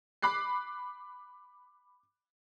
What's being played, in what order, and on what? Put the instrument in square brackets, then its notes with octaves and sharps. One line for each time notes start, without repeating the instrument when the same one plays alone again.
[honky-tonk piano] B5 D6 F#6 C7